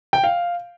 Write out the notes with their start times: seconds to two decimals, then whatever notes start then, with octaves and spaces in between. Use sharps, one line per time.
0.13 G5
0.24 F5